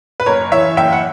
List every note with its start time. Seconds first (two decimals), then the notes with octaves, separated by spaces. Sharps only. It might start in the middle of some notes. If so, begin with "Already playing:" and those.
0.20 B4
0.26 F#1 A#4 C#5
0.52 E3 C#5 E5
0.77 F#1 E5 G5
0.92 F#5